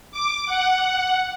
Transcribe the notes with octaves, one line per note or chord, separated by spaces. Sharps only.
D6
F#5